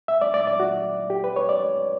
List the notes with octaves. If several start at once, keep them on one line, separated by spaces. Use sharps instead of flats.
E5
D5
D5
D5
F#4
G4
B4
C#5
D5